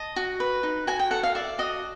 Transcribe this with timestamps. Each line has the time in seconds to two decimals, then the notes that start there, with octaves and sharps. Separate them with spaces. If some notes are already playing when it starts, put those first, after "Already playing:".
Already playing: D#5 A5
0.16 F#4
0.40 B4
0.63 D#4
0.87 F#4 G#5
0.99 G5
1.11 A4 F#5
1.23 F5
1.35 D5 E5
1.59 F#4 D#5